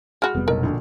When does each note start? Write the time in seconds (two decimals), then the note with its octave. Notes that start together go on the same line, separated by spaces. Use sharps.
0.22 G#3 F#4 B5 F6
0.35 F1 G3 B3
0.48 B1 B2 A#4
0.63 A#1 D3